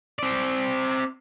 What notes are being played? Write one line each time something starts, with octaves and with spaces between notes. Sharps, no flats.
C4 D5